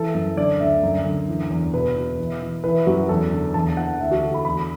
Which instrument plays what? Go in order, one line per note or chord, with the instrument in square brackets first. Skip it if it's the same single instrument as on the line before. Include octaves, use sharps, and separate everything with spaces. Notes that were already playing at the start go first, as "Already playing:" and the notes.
Already playing: [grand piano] E3 A4
F#2
D3 D5
D2 E5
F#2
D3
E3
E2
B2 B4
B2
E3
E3
E3 B4
F#2 F#4
E2 A4
D3
E2 A5
E3 F#5
D2 E5
F#4
D3 A4
B5
E2 B5